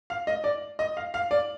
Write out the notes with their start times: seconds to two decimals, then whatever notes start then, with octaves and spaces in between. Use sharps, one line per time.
0.10 F5
0.27 D#5
0.44 D5
0.79 D#5
0.97 F5
1.14 F5
1.31 D5